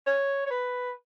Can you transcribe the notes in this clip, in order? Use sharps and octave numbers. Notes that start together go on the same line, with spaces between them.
C#5
C#5
B4